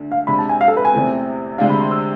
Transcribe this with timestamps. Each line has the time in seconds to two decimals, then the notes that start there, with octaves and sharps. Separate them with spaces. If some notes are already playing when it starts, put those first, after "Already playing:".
Already playing: D2 D3 A3
0.12 F5
0.27 C3 G#3 D4 B5
0.38 A5
0.49 G#5
0.61 F5
0.68 A4
0.77 B4
0.85 G#5
0.93 E2 C3 E3 A3 C4
1.58 D2 C3 G#3 D4 F5
1.69 B5
1.80 C6
1.91 E6